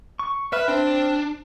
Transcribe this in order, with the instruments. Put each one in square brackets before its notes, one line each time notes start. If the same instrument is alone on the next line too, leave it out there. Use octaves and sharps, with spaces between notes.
[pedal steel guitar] C#6
[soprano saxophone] B4 [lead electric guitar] E5 [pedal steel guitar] F6
[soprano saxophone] C4 [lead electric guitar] D4